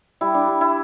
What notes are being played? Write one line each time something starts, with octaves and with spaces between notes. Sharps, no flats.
G3 E4
D4
G3
E4